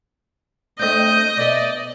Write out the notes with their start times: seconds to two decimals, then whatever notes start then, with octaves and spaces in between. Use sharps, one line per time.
0.79 A3 C4 D4 D#5 G6
1.37 B2 D5 E5